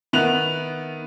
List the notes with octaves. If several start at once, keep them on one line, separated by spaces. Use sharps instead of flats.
D#3 B3 E5 F#6 F7